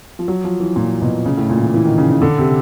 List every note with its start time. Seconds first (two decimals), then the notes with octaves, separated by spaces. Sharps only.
0.19 F3
0.28 F#3
0.44 F3
0.60 E3
0.76 A#2
1.01 B2
1.25 C#3
1.37 A2
1.50 A#2
1.62 E3
1.74 E3
1.85 D#3
1.98 C#3
2.10 C#3
2.22 D3
2.38 C3